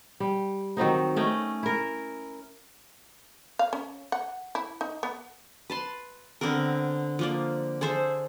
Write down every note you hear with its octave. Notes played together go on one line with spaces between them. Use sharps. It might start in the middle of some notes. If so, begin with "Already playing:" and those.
G3
D#3 F#3 C4 D#4
A3 C#4 D#5 G5
E4 A#4
F5
C#4
F#5
E4
D#4
B3
B4 A5 C6
D3 B3 C4 A#4
F3 A#3 D5
G#4 A4 C5 E5